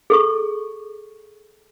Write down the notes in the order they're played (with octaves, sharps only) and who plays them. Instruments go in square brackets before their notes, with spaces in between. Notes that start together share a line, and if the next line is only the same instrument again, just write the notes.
[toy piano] G#4 A4 C#6